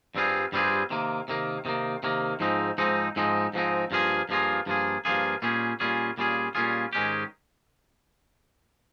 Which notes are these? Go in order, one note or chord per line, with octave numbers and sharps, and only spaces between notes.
G2 G3 C4 F4 G#4
G2 G3 C4 F4 G#4
C3 D#3 A#3
C3 D#3 A#3
C3 D#3 A#3
C3 D#3 A#3
G#2 F3 G#3 C4 D#4
G#2 F3 G#3 C4 D#4
G#2 F3 G#3 C4 D#4
G#2 F3 G#3 C4 D#4
G2 F3 A#3 F4 G#4
G2 F3 A#3 F4 G#4
G2 F3 A#3 F4 G#4
G2 F3 A#3 F4 G#4
A#2 G3 C#4 F4 G#4
A#2 G3 C#4 F4 G#4
A#2 G3 C#4 F4 G#4
A#2 G3 C#4 F4 G#4
G#2 D#3 G#3 C#4 G4